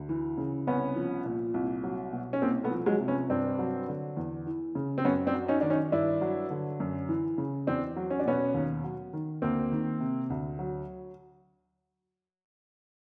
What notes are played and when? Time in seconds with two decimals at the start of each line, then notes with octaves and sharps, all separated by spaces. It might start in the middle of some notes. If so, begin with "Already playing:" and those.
Already playing: D2
0.09 E3
0.38 C#3
0.67 C2 B3 C#4
0.96 F3
1.25 A#2
1.54 C2
1.84 F#3
2.13 B2
2.33 C#4
2.42 C2 A#3 C4
2.64 A3 B3
2.71 F3
2.86 F#3 G#3
3.00 C3
3.08 B3 C#4
3.30 G2 C4 D4
3.59 F#3
3.88 D3
4.17 E2
4.47 E3
4.75 C#3
4.98 C4
5.05 F#2 B3 C#4
5.27 C4 D4
5.34 F#3
5.48 C#4 D#4
5.61 D#3 D4
5.70 C#4 D#4
5.92 G2 D4 E4
6.21 F#3
6.51 D3
6.80 F#2
7.09 E3
7.38 C#3
7.67 E2 C4 D4
7.96 F#3
8.11 C#4
8.19 D4
8.25 B2 B3 C#4
8.54 D#2
8.84 F#3
9.13 D#3
9.42 D2 A#3 C4
9.72 D#3
10.00 C3
10.30 D2
10.59 F#3